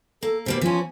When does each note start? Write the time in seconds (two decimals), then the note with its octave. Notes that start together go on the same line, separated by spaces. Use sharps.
0.23 A#3 A4
0.46 B2 G3 A#3 C5
0.61 E3 F3 C#4